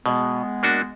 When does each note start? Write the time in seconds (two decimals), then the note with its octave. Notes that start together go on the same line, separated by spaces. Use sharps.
0.06 B2 G#3 B3
0.63 A#3 D4 F#4